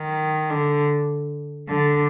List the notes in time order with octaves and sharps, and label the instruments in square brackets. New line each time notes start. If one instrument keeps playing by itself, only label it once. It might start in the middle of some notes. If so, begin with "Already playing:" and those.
Already playing: [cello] D#3
D3
D3